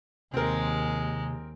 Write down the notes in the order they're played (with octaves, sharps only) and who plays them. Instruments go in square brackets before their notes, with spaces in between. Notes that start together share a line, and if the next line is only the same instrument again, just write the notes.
[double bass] D#2 [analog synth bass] C3 [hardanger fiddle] G#3 [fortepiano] C4 A#4